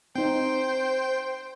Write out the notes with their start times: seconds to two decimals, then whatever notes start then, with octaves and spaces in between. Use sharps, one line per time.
0.15 C4 D#4 C5 G5